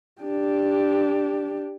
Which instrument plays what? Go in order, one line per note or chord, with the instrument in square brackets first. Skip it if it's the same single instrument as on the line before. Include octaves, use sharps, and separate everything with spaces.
[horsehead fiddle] D4 G4